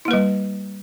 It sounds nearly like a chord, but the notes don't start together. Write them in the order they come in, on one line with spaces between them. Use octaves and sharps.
E4 A#3 B4 G3